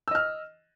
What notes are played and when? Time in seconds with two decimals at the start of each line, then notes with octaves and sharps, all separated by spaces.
0.08 E6
0.11 D#5
0.15 F6